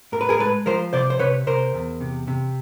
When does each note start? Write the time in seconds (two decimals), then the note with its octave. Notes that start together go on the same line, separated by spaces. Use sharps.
0.12 A2 A#4
0.21 B4
0.29 G#4 A#4
0.40 G#3 A4 B4
0.66 F3 A#4 C5
0.93 C3 C5 D5
1.10 C5
1.19 C3 B4 C#5
1.47 C3 A#4 C5
1.74 E2
2.01 C3
2.27 C3